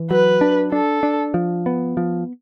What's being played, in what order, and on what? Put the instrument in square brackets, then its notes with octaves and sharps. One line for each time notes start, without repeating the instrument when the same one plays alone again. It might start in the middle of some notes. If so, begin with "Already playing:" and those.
Already playing: [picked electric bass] E3
[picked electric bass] F#3 [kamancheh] B4
[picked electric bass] D4
[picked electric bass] D4 [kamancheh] A4
[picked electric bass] D4
F3
B3
F3